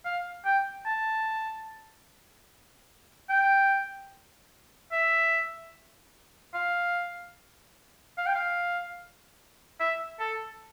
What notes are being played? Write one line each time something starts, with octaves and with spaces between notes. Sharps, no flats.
F5
G5
A5
G5
E5
F5
F5
G5
F5
E5
A4